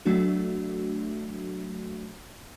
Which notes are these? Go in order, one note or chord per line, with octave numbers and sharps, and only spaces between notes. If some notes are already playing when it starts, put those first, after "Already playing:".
F#3 A3 D4 F#4